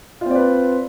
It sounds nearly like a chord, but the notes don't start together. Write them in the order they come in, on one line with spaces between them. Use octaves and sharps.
F4 C4 D5 B4